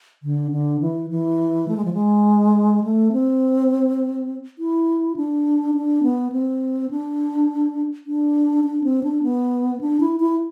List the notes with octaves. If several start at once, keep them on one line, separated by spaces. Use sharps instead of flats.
D3
D3
E3
E3
A3
G#3
F3
G#3
A3
C4
E4
D4
D4
B3
C4
D4
D4
D4
C4
D4
B3
D4
E4
E4